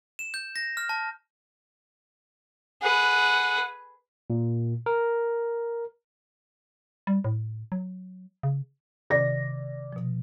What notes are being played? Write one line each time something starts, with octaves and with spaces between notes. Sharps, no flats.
E7
G6
A#6
F6
A5
G#4 B4 F#5
A#2
A#4
G3
A2
F#3
C#3
C3 D#3 D5 A#6
B2 F3